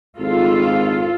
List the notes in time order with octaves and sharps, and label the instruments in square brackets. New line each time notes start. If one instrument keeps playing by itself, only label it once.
[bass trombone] G#1 [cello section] F4 A4